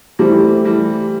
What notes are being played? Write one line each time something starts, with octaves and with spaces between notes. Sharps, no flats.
E3 G3 A3 E4 G4 C5
E3 G3